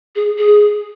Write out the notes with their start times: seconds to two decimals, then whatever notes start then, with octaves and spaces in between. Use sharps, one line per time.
0.16 G#4
0.38 G#4